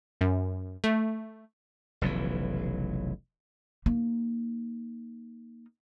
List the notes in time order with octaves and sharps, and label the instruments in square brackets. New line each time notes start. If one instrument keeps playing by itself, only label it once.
[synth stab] F#2
A3
[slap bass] F1 B1 C#3 E3
[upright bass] A#3 D#4